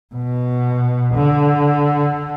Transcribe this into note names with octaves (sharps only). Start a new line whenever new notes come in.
B2
D3